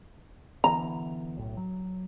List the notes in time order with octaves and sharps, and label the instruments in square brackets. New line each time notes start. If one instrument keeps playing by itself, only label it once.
[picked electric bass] D3 E3 B3 [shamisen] A#5
[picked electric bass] B1 A2
F#3